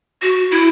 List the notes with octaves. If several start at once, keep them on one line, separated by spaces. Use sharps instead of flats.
F#4
E4